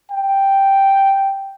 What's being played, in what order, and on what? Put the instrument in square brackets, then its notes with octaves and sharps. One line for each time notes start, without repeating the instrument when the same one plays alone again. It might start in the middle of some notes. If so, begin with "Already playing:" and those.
[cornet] G5